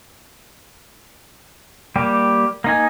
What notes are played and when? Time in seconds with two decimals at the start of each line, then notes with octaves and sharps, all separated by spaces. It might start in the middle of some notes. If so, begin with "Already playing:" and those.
1.96 G3 A#3 G4
2.64 A#3 D#4 G#5